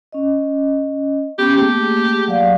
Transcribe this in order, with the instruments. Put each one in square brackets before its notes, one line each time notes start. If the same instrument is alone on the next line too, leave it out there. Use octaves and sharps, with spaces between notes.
[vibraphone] C#4 D#5
[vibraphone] B3 C#4 G5 [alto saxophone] G4
[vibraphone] A3 A#3 G#4 [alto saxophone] G4
[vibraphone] F#3 D5 F5